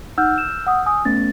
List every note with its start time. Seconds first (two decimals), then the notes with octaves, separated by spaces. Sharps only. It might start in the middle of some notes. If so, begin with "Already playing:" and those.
0.18 D#4 F#5 E6 F6 G6
0.38 E7
0.67 F#5 D#6
0.86 G#5 D#6
1.05 A3 B3 C#4 A6